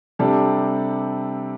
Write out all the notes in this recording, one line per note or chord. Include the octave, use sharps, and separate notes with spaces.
C3 G3 D4 A4